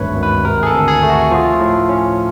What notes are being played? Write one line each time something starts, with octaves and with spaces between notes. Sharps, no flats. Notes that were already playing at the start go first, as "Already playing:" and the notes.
Already playing: G#1 D2 G2 A3 B4 C#5
G#1
B4
C3 A#4
G#4
A4
D2
G#4
A3
F#4
F3 F4
A2
C#4